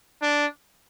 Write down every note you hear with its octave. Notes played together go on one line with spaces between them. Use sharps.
D4